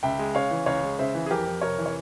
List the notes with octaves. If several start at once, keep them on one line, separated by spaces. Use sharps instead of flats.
C#2 E5 G5
G#3
C#3 C#5 F5
E3
C#2 C#5 F5
G#3
C#3 C5 E5
E3
G#4
F2 G4 A#4
F2
C3 A#4 C#5
E3
C#5